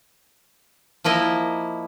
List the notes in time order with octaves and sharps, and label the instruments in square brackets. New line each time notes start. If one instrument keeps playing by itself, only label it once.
[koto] F3 A#3 E4 D#5